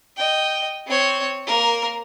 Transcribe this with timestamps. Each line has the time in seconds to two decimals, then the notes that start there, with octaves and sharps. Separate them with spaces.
0.17 D#5 G5
0.87 C4 C#5
1.47 A#3 A#4